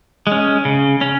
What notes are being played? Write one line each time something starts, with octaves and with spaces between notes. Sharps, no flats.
G#3 C#4
C#3
C#4